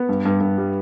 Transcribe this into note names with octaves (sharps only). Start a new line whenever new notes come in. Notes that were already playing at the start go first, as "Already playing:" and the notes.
Already playing: B3
G2
G2
G2
G3